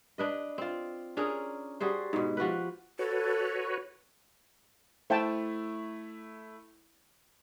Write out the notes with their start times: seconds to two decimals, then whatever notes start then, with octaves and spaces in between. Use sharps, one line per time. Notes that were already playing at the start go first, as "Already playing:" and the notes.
0.18 D4 B4 D#5
0.58 C4 F4
1.17 C#4 D4 G#4 A#4
1.80 G3 F#4 G#4 C5
2.13 G#2 B2
2.37 F3 F#4 G4 B4
2.99 F#4 A4 B4 C#5
5.10 A3 E4 C5 G5 A5